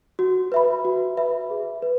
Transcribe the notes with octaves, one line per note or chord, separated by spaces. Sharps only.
F#4
B4 E5 B5
F#4
B4 E5 B5
G#4
B4